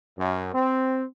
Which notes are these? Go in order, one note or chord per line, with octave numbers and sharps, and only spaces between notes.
F#2
C4